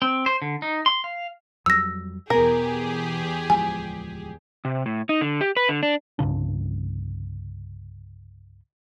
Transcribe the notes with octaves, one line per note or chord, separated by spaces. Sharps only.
C4
C5
D3
D#4
C6
F5
F2 F#3 G3 E6 A#6
E2 B2 B3 G4 G#4 A#4
D1 F3 G#3 G#5
C3
A2
D#4
D3
G4
B4
D3
D4
C2 G2 C#3 D4